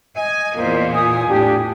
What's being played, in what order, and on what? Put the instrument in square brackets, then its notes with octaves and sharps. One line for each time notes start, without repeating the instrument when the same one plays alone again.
[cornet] D#5 [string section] G#5
[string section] E2 A#2 [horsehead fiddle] A#3 C5
[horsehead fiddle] F4 G#5 [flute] D#6
[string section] A2 [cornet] D4 [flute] G4